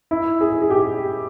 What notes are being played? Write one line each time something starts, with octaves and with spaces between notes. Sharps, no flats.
E4
G#4
G#4
G4